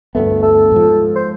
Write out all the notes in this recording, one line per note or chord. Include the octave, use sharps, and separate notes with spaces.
D2 G2 A3 B3
A4
G#2 F3
C5